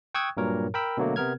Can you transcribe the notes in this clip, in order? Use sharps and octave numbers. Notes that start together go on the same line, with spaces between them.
G5 C#6 D#6 E6 F#6 G#6
G2 A#2 F#3 A#4 C#5
A#4 G5 B5 E6
B2 D3 F#3 A3 A#3
C3 B3 A#4 F6 G#6